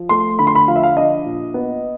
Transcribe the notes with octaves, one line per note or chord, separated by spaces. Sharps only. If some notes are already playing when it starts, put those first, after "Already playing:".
Already playing: F3
A3 C6
D3 B5
C6
B5
F3 F5
E5
F5
D4 D#5
A#2
B3